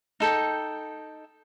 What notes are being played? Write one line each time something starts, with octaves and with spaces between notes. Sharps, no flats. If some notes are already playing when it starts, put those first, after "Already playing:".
D#4 A4 G5